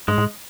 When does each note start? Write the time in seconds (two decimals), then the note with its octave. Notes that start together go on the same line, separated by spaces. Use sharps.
0.08 G#2 G#3
0.18 A2